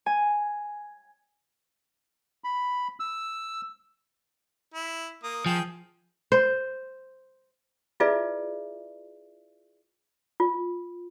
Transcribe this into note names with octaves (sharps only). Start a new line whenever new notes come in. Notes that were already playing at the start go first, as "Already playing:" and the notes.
G#5
B5
E6
E4
A#3 D#6
F3 G#4 G5
C5
E4 F4 G#4 B4 D5 E5
F4